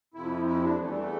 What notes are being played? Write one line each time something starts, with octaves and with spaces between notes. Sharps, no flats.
F2 C3 F3 E4
E4
D4
E2 E3 A3
G3
A3